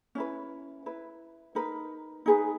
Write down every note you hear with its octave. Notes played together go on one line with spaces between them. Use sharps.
C#4 E4 B4
E4 B4
D#4 A#4 B4
D#4 G#4 B4